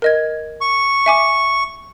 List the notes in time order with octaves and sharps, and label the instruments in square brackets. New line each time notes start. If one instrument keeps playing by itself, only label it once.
[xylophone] A#4 D#5 G#6
[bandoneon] C#6
[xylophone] E5 G#5 D6